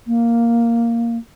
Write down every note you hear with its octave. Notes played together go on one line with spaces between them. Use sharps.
A#3